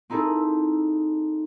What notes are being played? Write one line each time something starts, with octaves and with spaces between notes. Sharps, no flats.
C4 D#4 E4 G#4 A4